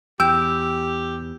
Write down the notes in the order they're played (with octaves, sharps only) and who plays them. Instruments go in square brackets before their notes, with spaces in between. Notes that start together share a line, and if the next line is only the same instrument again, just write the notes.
[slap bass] E2 [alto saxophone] G4 [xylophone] G5 G6 [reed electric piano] E6